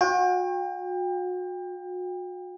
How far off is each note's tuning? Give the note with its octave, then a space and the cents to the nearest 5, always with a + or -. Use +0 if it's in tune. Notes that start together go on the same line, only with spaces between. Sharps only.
F#4 -35 G5 +30